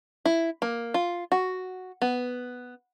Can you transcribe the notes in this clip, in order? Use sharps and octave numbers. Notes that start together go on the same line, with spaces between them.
E4
A#3
F4
F#4
B3